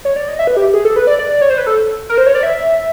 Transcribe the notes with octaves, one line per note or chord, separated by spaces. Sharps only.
C#5
D5
D#5
E5
B4
G4
G#4
A4
B4
D5
D5
D5
C#5
C5
B4
A4
A#4
C5
C#5
D5
E5